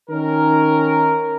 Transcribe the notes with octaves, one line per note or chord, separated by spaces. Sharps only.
D#3 C#4 A#4